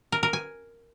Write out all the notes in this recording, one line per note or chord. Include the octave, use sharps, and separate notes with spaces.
A#4
A#4
G#5